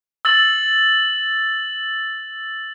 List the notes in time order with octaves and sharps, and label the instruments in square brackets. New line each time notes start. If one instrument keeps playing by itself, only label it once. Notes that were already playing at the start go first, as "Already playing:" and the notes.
[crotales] E6 A6 F#7